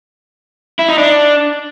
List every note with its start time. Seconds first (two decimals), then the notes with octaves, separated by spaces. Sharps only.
0.79 E4
0.89 D#4
0.98 D4